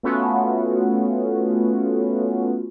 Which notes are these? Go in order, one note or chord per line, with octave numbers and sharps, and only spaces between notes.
A3 B3 C#4 F4 F#4